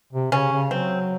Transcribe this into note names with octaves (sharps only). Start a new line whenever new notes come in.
C3
C#3 C#4
C#3
F#3 C4